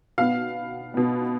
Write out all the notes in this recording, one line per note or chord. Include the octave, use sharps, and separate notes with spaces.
B2 B3 F5
B2 B3